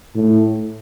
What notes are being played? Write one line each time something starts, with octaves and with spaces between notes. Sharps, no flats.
A2